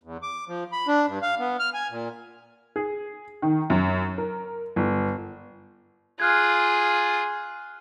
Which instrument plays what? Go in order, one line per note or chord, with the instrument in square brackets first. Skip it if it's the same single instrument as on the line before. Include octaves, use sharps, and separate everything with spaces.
[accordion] E2
D6
F3
B5
D4
G2
F5
B3
F6
G#5
A#2
[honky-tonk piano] G#4
D#3
F#2
A#4
G1
[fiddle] F4 G#4 [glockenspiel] F6 F#6 G#6